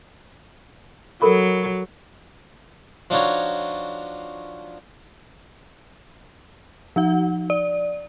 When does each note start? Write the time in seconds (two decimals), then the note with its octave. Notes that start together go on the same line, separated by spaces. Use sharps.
1.22 F#3 A4 A#4 B5
3.10 F3 D4 D#4 F4 F#4 C#5
6.96 F3 D#4 F#5
7.50 D5